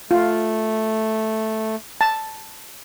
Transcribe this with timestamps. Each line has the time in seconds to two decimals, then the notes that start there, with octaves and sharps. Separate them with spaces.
0.11 A3 F4
2.01 A5